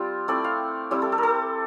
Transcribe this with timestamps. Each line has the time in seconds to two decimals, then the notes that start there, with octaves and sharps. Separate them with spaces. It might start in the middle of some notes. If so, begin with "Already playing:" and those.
Already playing: G3 C4 F4 G4
0.28 A3 C4 E4 D5
0.44 F5
0.91 G3 C4 E4 G4
1.02 A4
1.12 A4
1.18 A#4
1.23 A4